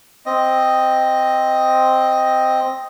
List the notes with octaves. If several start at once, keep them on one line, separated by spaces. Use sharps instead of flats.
C4 D#5